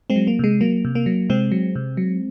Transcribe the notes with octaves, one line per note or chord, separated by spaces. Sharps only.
G#3 C4
F#3
A#3
C3 G#3
F#3 A#3
C3
A#3
F#3
C3 G#3 C4
F#3
C3
F#3